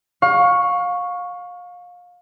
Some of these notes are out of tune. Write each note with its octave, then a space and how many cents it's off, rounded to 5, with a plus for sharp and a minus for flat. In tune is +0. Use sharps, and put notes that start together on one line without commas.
F5 +30 C#6 +0